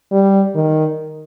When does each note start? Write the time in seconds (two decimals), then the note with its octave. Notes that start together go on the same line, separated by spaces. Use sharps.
0.12 G3
0.55 D#3